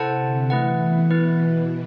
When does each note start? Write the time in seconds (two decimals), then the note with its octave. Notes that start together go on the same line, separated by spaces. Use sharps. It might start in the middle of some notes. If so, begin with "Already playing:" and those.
Already playing: C3 E4 A4 C5 F#5 A5
0.20 D3
0.50 E3 A3 E4 B4 F#5
0.80 B2
1.11 B3 E4 B4